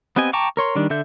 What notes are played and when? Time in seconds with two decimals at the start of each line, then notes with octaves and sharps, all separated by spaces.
0.16 B3 C4 G4 D#5 G#5
0.33 G5 A5 A#5 C#6 D6
0.57 A#4 C#5 C6
0.76 D#3 G3 D4
0.90 D3 A4 E5 G6